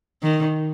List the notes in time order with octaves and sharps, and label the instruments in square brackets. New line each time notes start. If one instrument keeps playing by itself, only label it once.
[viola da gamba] D#3